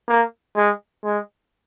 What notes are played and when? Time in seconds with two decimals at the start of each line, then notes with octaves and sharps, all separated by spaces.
0.08 A#3
0.56 G#3
1.04 G#3